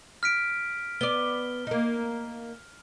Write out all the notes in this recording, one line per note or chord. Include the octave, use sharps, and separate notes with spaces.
F6 B6 D7
B3 D5 G7
A#3 D#4